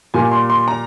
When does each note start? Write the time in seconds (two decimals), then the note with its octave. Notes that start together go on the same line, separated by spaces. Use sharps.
0.14 A#2 G3 A#3 G#5
0.31 C6
0.50 C6
0.68 A#5